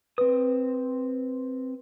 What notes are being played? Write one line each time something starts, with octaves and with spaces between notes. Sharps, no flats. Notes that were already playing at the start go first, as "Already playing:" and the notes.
C4 B4 D#6